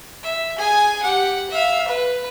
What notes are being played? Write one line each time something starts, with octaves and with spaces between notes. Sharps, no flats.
E5
G#4 G#5
G4 F#5
E5 F5
B4